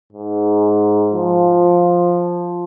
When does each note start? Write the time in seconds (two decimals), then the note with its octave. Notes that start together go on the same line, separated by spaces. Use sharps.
0.13 G#2
1.14 F3